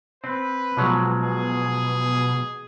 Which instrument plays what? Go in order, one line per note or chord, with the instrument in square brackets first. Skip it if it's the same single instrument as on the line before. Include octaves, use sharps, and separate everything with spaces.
[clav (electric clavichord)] C4 [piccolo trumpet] B4
[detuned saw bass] B2 [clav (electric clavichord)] F3 F#3 G#3
[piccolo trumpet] G#4